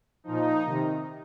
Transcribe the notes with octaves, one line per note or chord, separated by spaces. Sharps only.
A#2 F3 D#4
C3 D#3